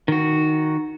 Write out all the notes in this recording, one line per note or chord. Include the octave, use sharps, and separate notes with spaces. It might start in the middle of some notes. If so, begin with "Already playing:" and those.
D#3 F#4